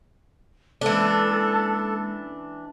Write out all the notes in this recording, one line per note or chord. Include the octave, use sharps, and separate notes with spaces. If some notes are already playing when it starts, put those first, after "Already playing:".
E3 G#3 A#3 C#4 D4 A4